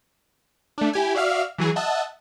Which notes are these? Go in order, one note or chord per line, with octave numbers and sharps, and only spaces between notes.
A3 D4
E4 G4 G#5
F#4 D5 E5 F5 F6
E3 F#3 G#4
D#5 E5 F#5 A5